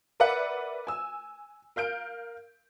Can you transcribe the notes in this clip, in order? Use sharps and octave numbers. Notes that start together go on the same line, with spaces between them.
A#4 B4 D5 E5 F#5
G#5 E6
A#4 F5 G6 D7